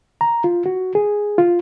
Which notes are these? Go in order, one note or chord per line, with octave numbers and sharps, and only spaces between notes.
A#5
F4
F#4
G#4
F4